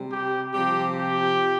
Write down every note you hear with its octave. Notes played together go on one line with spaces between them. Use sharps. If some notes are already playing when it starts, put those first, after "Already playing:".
Already playing: C3 G3
G4
C3 F3 G4
G4